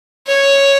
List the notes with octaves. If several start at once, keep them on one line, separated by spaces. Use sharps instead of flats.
C#5